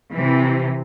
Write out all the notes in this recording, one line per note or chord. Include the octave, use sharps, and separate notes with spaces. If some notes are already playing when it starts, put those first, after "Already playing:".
C3 E3